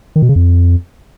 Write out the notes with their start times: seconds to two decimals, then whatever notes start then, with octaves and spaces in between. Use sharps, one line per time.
0.16 D#3
0.22 B2
0.29 C#3
0.36 F2